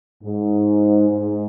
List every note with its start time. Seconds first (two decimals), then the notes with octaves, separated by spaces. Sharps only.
0.23 G#2
1.08 G#2